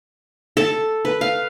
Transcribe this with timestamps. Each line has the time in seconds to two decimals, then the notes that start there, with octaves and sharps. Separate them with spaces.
0.57 A4
1.05 B4
1.21 F5